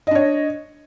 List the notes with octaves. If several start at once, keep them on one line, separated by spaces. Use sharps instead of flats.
D4 C#5 D#5